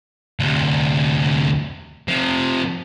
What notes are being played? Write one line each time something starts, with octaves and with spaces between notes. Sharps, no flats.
D2 C3
C3 F3